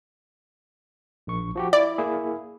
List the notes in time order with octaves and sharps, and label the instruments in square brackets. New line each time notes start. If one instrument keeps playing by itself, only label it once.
[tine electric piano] A#1 C#6
F3 F#4 G4
[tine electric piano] E4 [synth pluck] D5
[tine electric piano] A#3 E4 G#4